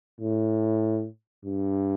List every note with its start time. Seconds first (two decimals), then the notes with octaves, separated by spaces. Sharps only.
0.20 A2
1.45 G2